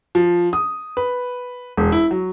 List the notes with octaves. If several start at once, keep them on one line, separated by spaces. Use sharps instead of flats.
F3
D#6
B4
E1
E4
F#3